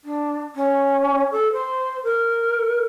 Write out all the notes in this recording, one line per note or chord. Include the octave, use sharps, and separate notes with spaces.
D4
C#4
A4
C5
A#4